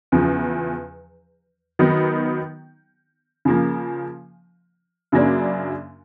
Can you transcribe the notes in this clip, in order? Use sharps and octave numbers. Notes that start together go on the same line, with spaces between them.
E2 C#3 F3
D#3 F#3 B3 D#4
C#3 F3 A#3
F#2 C#3 F#3 A#3 D4